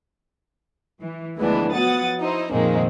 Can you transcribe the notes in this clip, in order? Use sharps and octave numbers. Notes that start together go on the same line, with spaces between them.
E3
D2 E3 F3 G#3 B3 D4
F3 F#3 B3 F#5 D#6 A6
D#4 E4 C5
F2 A#2 D#3 G#3 A#3 C4